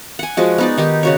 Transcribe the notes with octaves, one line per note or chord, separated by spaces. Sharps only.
F#5 G#5
F3 G#3 F#4
B3 D#4 D5
D#3 D#4 G4
C#3 F#4 C#5